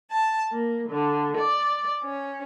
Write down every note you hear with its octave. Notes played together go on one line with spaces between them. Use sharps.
A5
A#3
D3
D5
C#4